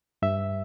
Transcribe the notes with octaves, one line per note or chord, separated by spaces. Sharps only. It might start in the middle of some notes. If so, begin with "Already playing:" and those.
G2 E5